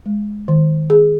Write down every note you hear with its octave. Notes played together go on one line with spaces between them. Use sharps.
G#3
D#3
G#4